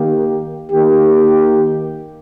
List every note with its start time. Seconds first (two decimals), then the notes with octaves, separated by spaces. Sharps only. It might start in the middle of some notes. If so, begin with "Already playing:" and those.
Already playing: D#3 A#3 G4
0.71 D#3 A#3 G4